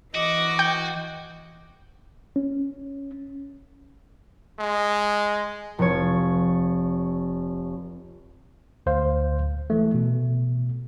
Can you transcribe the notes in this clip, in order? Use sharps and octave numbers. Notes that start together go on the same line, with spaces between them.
E3 F#4 D#5 D6
G5
C#4
G#3
F1 C#5
D2 C5 F5
E3 A3
B2